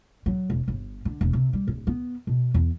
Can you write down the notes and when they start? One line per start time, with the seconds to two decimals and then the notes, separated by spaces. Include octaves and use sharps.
0.26 F#3
0.50 E1
0.68 G1
1.05 D3
1.21 E1
1.33 C3
1.53 G3
1.67 D1
1.87 B3
2.27 B2
2.54 E2